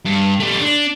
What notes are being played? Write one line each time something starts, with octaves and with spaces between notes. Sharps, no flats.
G2
A3 G4
D4